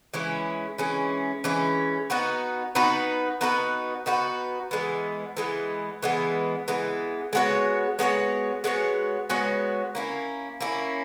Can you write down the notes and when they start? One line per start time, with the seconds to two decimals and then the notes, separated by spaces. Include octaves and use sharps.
0.14 E3 G#3 C#4 E4
0.78 E3 G#3 C#4 E4
1.44 E3 G#3 C#4 E4
2.10 B3 D#4 F#4 B4
2.75 B3 D#4 F#4 B4
3.41 B3 D#4 F#4 B4
4.06 B3 D#4 F#4 B4
4.71 E3 G#3 B3
5.37 E3 G#3 B3
6.03 E3 G#3 B3
6.68 E3 G#3 B3
7.33 G#3 B3 F#4 C#5
7.99 G#3 B3 F#4 C#5
8.64 G#3 B3 F#4 C#5
9.29 G#3 B3 F#4 C#5
9.95 A#3 C#4 E4
10.60 A#3 C#4 E4